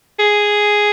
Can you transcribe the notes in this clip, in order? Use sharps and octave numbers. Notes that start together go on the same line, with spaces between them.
G#4